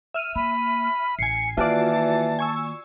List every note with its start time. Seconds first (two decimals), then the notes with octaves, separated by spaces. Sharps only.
0.14 E5 F6 D#7
0.36 A#3 B5
1.19 A1 G#5 C7 C#7
1.57 D#3 E3 A#3 F4 F#4 D5 A5
2.39 G#5 C#6 E6